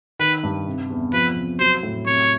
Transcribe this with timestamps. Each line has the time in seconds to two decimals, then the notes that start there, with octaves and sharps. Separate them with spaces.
0.19 D#3 B4
0.43 G2
0.66 C3
0.90 E2
1.13 F3 B4
1.36 C3
1.59 F#3 C5
1.83 A2
2.06 C3 C#5